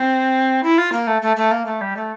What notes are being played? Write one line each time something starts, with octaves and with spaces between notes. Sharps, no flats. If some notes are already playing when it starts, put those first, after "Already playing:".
Already playing: C4
E4
F4
A#3
A3
A3
A3
A#3
A3
G3
A3